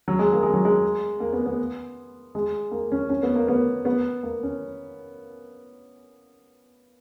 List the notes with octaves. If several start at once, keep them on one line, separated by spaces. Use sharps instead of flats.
F#3
G#3
A#3
G#3
F#3
G#3
A#3
B3
B3
G#3
A#3
C#4
C#4
B3
A#3
B3
B3
A#3
C#4